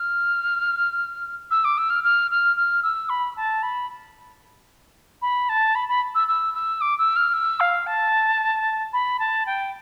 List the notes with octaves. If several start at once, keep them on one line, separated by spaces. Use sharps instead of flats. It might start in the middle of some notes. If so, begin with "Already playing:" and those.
Already playing: F6
E6
D6
E6
F6
F6
F6
F6
E6
B5
A5
B5
B5
A5
B5
B5
E6
E6
E6
D6
E6
F6
E6
F5
A5
B5
A5
G5